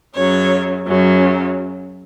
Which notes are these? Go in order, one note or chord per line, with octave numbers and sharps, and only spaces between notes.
F#2 C#3 F#3 C#5
F#2 C#3 F#3